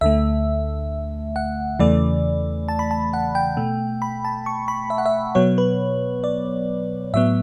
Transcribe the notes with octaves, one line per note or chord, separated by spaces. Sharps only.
D2 D3 A3 E5
F#5
E2 C#3 E3 A3 D5
A5
B5
A5
F#5
G5
B2 A3
B5
A5
C#6
B5
E5
F#5
E5
B2 F#3 B3 C#5
B4
D5
A2 F#3 B3 E5